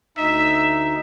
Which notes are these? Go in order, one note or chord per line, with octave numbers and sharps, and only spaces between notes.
D2 D#4 E5